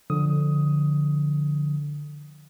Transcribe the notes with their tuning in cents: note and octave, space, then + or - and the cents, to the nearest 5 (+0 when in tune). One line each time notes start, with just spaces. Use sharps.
D3 +0 F3 +0 D#6 +15